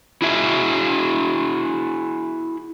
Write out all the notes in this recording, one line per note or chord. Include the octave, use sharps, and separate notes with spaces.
E4 F#4 G#4 E5